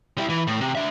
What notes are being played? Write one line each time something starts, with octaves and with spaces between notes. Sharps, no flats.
G3 E4
E3
A2
C3
D4 E5